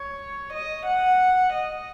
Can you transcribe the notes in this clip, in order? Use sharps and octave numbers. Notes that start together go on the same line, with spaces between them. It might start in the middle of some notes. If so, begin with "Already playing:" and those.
Already playing: C#5
D#5
F#5
D#5